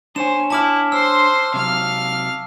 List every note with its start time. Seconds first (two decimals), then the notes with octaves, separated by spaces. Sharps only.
0.16 D4 C5 C#5 G#5 E7
0.50 E4 A5 D6 F6
0.92 C5 C6 E6
1.54 C3 F#3 F5 F6